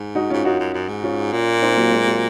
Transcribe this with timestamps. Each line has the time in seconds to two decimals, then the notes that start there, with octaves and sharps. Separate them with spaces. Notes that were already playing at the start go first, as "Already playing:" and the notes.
Already playing: G#2
0.15 D#4 F#4
0.30 G#2 C#4 F4
0.45 F#2 D#4 F#4
0.60 F#2
0.74 F#2
0.89 G#2
1.03 C#4 F4
1.33 A#2
1.62 C4 D#4
1.77 F#3 A#3
1.91 G#3 C4
2.06 F#3 A#3